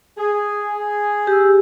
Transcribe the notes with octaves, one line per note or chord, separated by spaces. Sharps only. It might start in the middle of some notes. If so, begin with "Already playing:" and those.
G#4
G4 E6